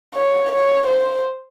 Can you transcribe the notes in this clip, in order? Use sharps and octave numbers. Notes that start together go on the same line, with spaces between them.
C#5
C#5
C5